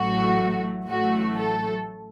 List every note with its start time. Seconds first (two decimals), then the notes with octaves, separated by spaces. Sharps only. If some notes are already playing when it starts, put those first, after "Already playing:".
Already playing: A1 A2 F#3 A3 F#4
0.87 A1 A2 F#3 A3 F#4
1.36 A4